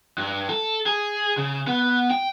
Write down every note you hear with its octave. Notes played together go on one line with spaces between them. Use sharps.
G2
A4
G#4
C#3
B3
G5